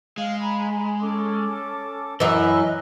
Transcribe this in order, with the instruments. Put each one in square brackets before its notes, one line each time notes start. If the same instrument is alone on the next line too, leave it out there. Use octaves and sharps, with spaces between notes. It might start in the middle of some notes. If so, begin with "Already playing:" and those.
[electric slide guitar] G#3 [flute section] F5
[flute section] G#5 A#5 B5
C#4 A4 D6
[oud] F#2 E3 [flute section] B4 E6 F#6 [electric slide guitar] D#5